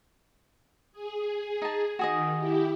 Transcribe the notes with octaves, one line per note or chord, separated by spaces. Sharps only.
G#4
D#4 A5
D#3 F#4 G#4 D#5
E4 G4